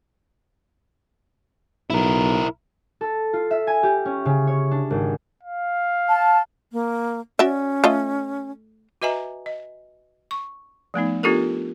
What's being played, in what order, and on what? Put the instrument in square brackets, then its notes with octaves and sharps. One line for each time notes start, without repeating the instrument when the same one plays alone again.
[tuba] B1 [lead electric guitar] E4 A#4
[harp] A4
F4
E5
G#5
G4
C#4
C#3
C#5
D4
G#1
[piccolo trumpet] F5
[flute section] A5
[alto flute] A#3
[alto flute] C#4 [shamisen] F#4 D5 E5
[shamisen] A3 F4 D#5
[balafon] F#4 B4 D#5 E5 G#5 A#5
D#5
C#6
F3 A3 B3 D#4
B3 D4 F4 G4 A4 A#4